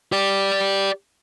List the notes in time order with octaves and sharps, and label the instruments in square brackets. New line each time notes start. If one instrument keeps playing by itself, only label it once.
[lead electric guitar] G4 D5